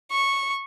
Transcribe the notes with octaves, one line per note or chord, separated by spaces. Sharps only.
C#6